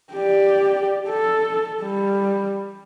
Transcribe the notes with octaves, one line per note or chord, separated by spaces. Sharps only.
G4 D5
A4
G3